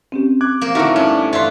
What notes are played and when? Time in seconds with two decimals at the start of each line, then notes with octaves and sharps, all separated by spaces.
0.12 C4 C#4 G4
0.41 D6 F#6 G#6
0.61 A#3 A#4 C5
0.75 D3 A3 D#4 E4 F#4 A#4 C#6
0.96 G2 C#4 D4
1.33 G2 F4 B4 C#5 E5 C6